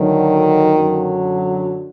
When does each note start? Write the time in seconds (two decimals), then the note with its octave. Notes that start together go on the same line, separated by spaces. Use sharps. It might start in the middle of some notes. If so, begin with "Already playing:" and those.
Already playing: D2 D3 D#3 F#3
0.75 F#2 D3 F#3